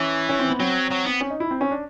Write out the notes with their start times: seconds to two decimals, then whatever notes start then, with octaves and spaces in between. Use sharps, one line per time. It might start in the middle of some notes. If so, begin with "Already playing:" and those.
Already playing: E3 C#4
0.29 C#4
0.39 C4
0.49 B3
0.60 F#3 C4
0.91 F#3
1.05 B3
1.21 C#4
1.30 D#4
1.40 E4
1.51 C4
1.61 C#4
1.71 D4